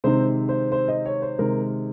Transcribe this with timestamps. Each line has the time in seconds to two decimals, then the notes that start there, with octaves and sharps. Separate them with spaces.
0.04 C3 D#3 G#3 C4 D#4 C5
0.49 C5
0.72 C5
0.88 D#5
1.06 C#5
1.22 C5
1.39 C3 D#3 G#3 A#4